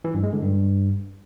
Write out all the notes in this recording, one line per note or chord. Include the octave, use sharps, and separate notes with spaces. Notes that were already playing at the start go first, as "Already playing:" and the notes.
E3
G2
G#3
D3
G2